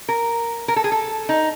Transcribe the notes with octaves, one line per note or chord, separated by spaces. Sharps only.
A#4
A#4
A4
G#4
A4
D#4